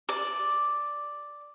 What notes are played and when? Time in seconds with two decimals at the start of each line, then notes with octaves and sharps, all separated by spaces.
0.09 D5